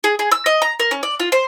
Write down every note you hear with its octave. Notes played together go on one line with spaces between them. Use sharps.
G#4
G#4
E6
D#5
A#5
A#4
C#4
D5
F4
C5